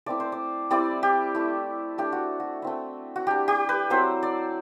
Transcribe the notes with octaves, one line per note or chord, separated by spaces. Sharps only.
A3 C4 E4 D5
C5
D5
G3 C4 E4 D5
G4
A3 E4
A3 D4 G4
F#4
F#4
A3 C4 E4
F#4
G3 D4 G4
G4
B4
F#3 C4 E4 C5
D5